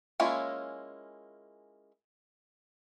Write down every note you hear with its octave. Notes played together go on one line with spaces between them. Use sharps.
G#3 A#3 C#4 E4 F4